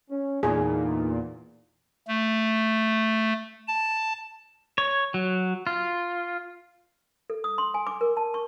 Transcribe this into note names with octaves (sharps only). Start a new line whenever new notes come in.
C#4
E2 A#2 D3 G#3 D#4 G#4
A3
A5
C#5
F#3
F4
A4
D#6
C6
G#5
D6
A#4
A5
C#6